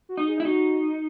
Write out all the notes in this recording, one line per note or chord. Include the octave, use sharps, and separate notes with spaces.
F#4
D#4
G#4
E4
D#4 F#4